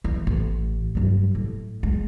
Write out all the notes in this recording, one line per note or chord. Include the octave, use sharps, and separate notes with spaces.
E3
A1
G2 F#3
A2
G#3